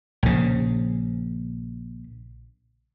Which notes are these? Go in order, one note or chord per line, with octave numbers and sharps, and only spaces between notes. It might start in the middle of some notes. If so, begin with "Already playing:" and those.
A#1 C#3